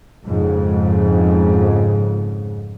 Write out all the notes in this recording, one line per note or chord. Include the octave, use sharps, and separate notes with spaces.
F2 G#2 C#3